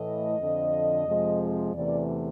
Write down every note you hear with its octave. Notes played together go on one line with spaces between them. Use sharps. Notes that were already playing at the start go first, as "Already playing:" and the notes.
Already playing: A2 E3 A3 D#5
F2 D3 F3
F2 C3 F3 G#3
E2 C3 E3 A3 D5